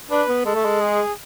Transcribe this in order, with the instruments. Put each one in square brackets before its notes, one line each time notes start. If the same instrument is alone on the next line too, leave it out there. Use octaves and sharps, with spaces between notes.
[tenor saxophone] D4 [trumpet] B4
[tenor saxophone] B3
[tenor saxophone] G#3 [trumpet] A4
[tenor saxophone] A3
G#3
[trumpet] G#4